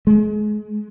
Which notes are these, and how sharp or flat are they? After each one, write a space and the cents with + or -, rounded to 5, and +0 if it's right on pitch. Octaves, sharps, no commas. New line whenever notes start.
G#3 +30